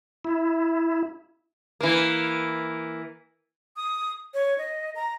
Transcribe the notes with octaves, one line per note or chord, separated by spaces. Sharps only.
E4
E3 A#3
D#6
C#5
D#5
A#5